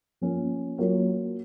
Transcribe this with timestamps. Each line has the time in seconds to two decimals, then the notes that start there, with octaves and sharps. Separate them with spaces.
0.21 F3 A#3 C#4
0.78 F#3 A#3 F4 A#4 C#5